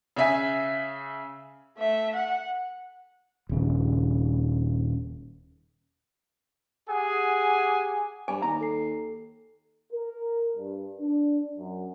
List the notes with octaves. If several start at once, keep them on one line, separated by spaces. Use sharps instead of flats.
C#3 E5 G#5
A3 E5
F#5
D#1 C#3
G4 G#4 F#5 G#5
G2 G#5 D6
D#2 A#5
A4 C7
A#4
G2
D4
F#2